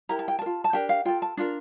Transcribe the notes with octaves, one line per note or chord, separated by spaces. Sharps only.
E4 G4 A#4 A#5
A5
G5
A#4 A5
F4
A5
D4 G4 A#4 G5
F5
F4 A4 G5
A5
D4 F4 A#4